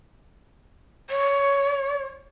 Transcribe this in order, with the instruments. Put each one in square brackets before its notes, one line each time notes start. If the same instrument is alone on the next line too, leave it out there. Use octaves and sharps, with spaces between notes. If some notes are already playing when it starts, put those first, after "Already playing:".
[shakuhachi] C#5